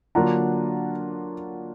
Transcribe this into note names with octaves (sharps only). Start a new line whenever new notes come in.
D3 F#3 A#3 D4 F4 F#5 A#5